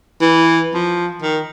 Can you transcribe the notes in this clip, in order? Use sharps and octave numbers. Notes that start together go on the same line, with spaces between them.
E3
F3
D#3